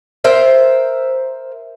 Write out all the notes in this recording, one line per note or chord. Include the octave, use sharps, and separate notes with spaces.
A#4 C5 E5